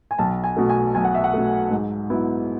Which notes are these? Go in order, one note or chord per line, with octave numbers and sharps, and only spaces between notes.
G#5
B1 A5
G#5
B2 A3
G#5
B1 G#5
F#5
E5
F#5
B2 A3
G#2
F#3 B3 E4